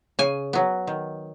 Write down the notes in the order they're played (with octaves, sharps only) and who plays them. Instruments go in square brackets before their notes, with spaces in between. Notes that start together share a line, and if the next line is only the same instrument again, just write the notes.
[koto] C#3 G#5
F#3 B3
D#3